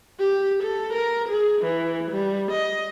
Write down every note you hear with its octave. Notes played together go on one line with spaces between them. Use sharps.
G4
A4
A#4
G#4
E3
G3
D#5